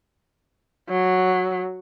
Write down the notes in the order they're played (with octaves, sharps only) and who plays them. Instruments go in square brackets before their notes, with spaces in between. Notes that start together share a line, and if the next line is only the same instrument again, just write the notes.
[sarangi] F#3